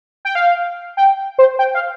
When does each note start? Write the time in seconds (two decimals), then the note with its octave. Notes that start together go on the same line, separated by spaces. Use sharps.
0.25 G5
0.35 F5
0.97 G5
1.38 C5
1.59 G5
1.74 F5